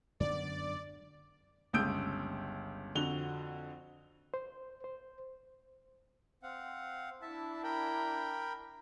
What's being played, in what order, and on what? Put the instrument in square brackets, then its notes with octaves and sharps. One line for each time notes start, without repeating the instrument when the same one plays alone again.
[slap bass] F#2 D3 B3 [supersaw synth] D5
[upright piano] G1 C#2 D#6 E6 G6 D7
F2 D3 F#4 F7 G7
[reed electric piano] C5
C5
[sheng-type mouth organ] C4 F5 F#5
[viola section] D4 E4 [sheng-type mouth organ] E5 A5
[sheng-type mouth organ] A#4 G5 B5